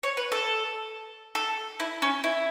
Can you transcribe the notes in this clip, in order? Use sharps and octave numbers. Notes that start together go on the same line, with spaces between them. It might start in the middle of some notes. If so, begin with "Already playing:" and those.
C#5
B4
A4
A4
E4
C#4
E4